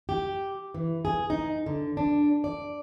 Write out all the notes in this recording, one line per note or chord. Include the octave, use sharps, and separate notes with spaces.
G4
E3
G#4
D#4
D3
D4
D5